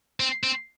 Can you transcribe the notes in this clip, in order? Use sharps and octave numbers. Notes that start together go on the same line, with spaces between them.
C4
C4